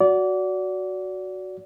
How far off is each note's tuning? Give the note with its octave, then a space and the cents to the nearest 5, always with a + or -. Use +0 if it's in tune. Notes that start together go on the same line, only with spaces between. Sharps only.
F#4 +0 D5 -25